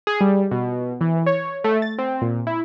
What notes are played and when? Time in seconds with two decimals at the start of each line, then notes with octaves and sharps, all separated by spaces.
0.07 G#4
0.21 G3
0.51 B2
1.01 E3
1.26 C#5
1.64 A3
1.82 A6
1.98 C4
2.21 A#2
2.47 E4